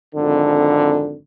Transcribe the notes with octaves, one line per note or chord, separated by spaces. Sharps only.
G#1 F2 D3